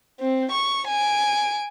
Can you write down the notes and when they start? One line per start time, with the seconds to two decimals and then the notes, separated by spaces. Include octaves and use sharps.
0.20 C4
0.51 C#6
0.88 G#5 D7